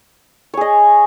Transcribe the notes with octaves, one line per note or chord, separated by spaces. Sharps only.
G#4 C#5 D#5